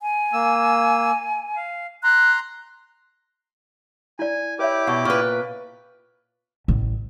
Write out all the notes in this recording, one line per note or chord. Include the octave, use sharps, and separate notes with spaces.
G#5
A#3 E6
F5
A#5 C6 F#6
E4 D5 G#5
E4 G4 B4 C#5 E5 D6
B2 F#5 C#6
A#2 B4 C#6
A1